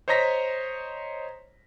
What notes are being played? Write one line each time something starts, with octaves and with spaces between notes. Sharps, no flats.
C5 C#5 D#5 A#5 A#6 B6